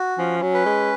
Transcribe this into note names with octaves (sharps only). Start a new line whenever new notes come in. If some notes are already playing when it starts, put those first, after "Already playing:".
Already playing: F#4
F3 C#4
F#3
B4
G#3